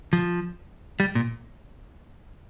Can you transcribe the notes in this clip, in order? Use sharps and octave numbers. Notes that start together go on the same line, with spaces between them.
F3
G3
A#2